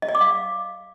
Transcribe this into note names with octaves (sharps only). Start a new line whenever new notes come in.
D#5
D5
D6
F5